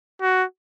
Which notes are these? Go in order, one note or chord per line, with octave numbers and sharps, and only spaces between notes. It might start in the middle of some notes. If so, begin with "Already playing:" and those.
F#4